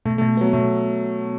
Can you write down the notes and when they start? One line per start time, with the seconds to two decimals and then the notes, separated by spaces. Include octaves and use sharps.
0.05 B2 A3
0.18 A3
0.22 B2
0.37 F#3 B3
0.53 B2 A3